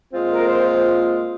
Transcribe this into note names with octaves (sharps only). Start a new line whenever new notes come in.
A#2 G#3 C4 F4
A#4
C5